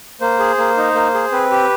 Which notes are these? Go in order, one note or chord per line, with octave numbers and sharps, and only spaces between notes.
A#3 C5
G#4
A#3
D#4
A#3
G#4
C4 B4
G4